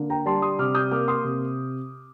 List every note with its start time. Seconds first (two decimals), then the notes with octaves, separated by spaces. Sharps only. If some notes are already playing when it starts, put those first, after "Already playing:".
Already playing: D3 A#3
0.10 G5 A#5
0.26 G3 A5 C6
0.42 C6 D#6
0.59 C3 D6 F6
0.75 D#6 G6
0.91 A#3 D6 F6
1.08 C6 D#6
1.24 C3